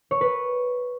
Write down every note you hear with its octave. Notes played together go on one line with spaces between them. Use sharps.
C#5
B4